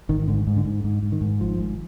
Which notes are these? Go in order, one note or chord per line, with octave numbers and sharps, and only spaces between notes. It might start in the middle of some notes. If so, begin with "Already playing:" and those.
G#1 D#3
G#2 D3
G#2
D3
G#2
G#2
G#2
D#3
G#2
G#1 F3
G#2